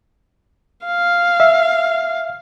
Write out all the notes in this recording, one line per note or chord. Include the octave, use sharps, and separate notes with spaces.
F5
E5